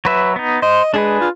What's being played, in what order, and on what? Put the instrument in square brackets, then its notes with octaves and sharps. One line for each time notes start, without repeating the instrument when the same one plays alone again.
[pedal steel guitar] F#3 B4 E5
B3 D#4
[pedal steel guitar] C5 [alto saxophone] D#5
[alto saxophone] G#3 [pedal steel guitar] D4 G#4 B4
[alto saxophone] F4